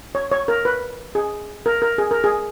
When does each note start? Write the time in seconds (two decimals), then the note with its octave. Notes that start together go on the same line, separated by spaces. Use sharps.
0.15 C#5
0.31 C#5
0.48 A#4
0.65 B4
1.15 G#4
1.66 A#4
1.82 A#4
1.98 G#4
2.11 A#4
2.24 G#4